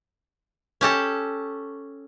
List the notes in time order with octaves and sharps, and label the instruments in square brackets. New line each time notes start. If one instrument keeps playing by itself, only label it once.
[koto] C#4 G4 A4